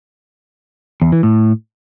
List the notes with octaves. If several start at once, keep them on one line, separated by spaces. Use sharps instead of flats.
E2
E3
A2